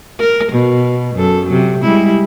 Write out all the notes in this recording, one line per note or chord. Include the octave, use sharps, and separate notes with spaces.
A#4
B2
F#2 A4
C3 F#3
G3 G#3 E4